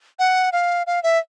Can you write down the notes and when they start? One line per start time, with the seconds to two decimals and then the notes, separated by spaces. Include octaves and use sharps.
0.19 F#5
0.53 F5
0.87 F5
1.03 E5